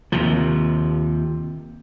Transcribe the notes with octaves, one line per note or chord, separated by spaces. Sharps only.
D#2 C3 F3